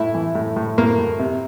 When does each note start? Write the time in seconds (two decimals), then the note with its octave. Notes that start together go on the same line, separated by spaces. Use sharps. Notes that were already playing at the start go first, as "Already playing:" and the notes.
Already playing: A2 E4
0.14 E3
0.35 A2
0.56 A2
0.78 A2 A#3
0.98 A2
1.19 C3